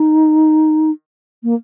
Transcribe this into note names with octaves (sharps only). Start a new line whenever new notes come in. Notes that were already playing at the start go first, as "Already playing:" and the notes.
Already playing: D#4
A#3